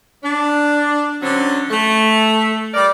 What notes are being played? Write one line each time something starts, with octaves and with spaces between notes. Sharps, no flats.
D4
D3 F#3 C4 C#4
A3
G3 A#4 D5